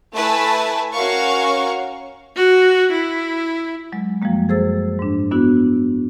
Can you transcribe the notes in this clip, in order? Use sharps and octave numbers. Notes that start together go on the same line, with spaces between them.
A3 E4 B4 G#5 A5
C#4 F#4 A#4 C#5 F5 C#6
F#4
E4
F#3 G#3
F#2 F3 G3 G#3 A#3
F#2 G#4 A4 C5 E6 A6
G#2 D4
B3 D4 E4 F#4